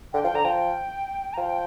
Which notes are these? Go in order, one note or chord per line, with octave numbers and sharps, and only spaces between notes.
D3 G5
F3 G5
D3 A#5
F3 G5
A#5
F3 G5